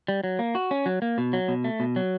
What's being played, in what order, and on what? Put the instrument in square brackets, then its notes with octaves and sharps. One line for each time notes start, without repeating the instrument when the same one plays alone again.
[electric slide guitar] G3
F#3
A#3
F#4
C#4
F#3
A#3
B2
F#3
B2
A3
B2
F#3